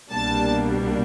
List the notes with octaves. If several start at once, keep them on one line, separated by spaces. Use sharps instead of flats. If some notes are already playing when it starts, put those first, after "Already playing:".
C2 B2 G3 A#3 D4 A5